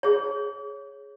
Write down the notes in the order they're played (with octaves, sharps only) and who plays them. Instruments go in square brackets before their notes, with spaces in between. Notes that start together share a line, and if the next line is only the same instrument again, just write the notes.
[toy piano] G#4 C#5